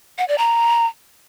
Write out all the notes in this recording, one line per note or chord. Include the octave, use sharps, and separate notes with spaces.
F#5
D5
A#5